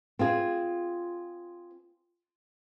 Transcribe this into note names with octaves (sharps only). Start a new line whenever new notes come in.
C4 F4 G#4